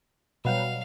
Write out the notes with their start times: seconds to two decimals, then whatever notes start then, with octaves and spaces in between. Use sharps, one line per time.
0.45 B2 F#3 G3 F5